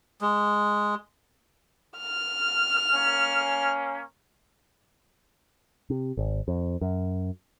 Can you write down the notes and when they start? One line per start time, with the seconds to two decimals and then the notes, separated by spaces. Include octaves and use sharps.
0.21 G#3
1.98 F6
2.94 A#3 C#4
5.90 C3
6.17 G#1
6.48 F2
6.81 F#2